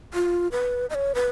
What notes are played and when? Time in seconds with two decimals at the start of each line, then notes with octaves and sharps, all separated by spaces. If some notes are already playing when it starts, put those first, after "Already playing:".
0.14 F4
0.52 B4
0.90 D#5
0.95 C#5
1.15 B4